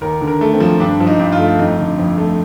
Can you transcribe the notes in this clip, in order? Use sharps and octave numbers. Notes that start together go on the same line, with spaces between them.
D#2 A#4
D3
A#4
A3
C4
F3
G2 D4
F3
D#4
G2
F4
A3
F2 D#4
D3
F2
A3